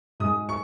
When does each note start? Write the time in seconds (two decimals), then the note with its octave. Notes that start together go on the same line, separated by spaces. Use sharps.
0.20 G#2 G#3 D#6
0.49 C#6